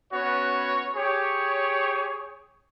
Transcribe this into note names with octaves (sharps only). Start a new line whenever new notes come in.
B3 C#4 F#4 C#5
G4 G#4 C#5